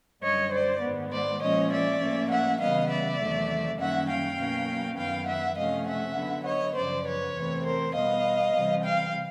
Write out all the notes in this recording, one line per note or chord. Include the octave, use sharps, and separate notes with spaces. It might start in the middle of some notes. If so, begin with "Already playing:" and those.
F#2 D3 G3 C#5 D#5
C5 D5
G#2 D#3 G#3 B3
C5 D5
A#2 F3 G#3 C#4 C#5 D#5
D5 E5
A2 F3 A#3 C#4
E5 F#5
C#3 E3 G3 B3 D#5 F5
D5 E5
E2 C3 D#3 F#3 A3
F#2 D#3 G3 A#3 C#4 E5 F#5
F5 G5
B2 F#3 A#3 C#4
F#2 D#3 F#3 B3 F5 G5
E5 F#5
C3 F3 A3 C#4 D#5 F5
E5 F#5
D3 F#3 B3
C#5 D#5
F#2 C#3 F3 C5 D5
B4 C#5
E2 C3 E3 A3 C4
A#4 C5
B2 G3 B3 D#5 F5
C3 E3 G3
F5 G5